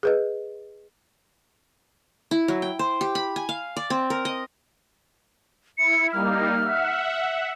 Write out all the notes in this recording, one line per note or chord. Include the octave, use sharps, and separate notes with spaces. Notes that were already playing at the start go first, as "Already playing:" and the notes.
G#4 B4 D#5
E4
F#3
G5
C5
G4
B5
G#5
F5
D5
C4
A#4
D#5
E4 C#7
G3 A#3 D#4 F6
E5 F#5